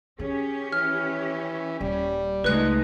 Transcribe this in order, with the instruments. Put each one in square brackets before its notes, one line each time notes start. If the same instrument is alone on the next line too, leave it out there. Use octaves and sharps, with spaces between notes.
[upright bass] D#3 [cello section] C#4 G4 [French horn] G#4
[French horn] E3 [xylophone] F6
[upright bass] D#1 [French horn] G3
[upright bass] C#2 [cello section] G#3 A3 D#4 [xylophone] B4 F#6